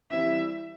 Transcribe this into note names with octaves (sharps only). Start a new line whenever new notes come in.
E3 G3 C4 E4 E5